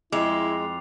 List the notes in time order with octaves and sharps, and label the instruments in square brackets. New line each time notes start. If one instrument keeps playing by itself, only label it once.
[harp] F2 [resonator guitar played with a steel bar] G#3 [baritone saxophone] E4 [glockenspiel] D6 C7 F7